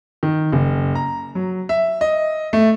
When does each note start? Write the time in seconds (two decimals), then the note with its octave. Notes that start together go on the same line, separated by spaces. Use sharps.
0.23 D#3
0.52 F#1
0.95 A#5
1.35 F#3
1.69 E5
2.01 D#5
2.53 A3